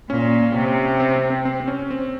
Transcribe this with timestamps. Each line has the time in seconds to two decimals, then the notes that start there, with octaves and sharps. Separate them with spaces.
0.10 A#2 C#4
0.54 C3
1.00 C4
1.16 C4
1.30 C4
1.45 C4
1.60 C4
1.68 C#4
1.90 C4